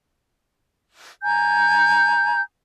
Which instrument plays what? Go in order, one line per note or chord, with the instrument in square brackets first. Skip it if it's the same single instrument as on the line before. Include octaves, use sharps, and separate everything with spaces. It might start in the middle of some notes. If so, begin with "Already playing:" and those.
[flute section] G#5 A#5 G6